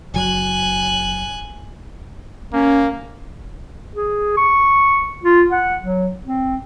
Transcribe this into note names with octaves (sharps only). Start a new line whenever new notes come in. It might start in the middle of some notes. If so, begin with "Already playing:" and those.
F#1 F#3 G#5 F#6
A#3 C#4
G#4
C#6
F4
F#5
F#3
C4